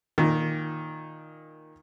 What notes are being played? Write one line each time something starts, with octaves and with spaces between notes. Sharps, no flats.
A#2 D#3